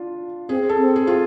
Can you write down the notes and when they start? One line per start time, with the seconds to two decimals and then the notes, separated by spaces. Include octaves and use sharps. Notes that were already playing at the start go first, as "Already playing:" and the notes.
Already playing: D4 F4
0.49 C4 G#4
0.69 A4
0.78 C4
0.96 G#4
1.07 F4